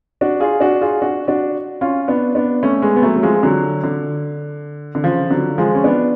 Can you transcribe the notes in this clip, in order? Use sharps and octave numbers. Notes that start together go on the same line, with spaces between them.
D4 F#4
F4 G#4
D4 F#4
F4 G#4
D4 F#4
D4 F#4
C#4 F4
B3 D4
B3 D4
A3 C#4
G#3 B3
B3
F#3 A3
F#3
F3 G#3
D3 F#3
D3
D3
C#3 F3
D3 F#3
F3 G#3
C#4
B3 D4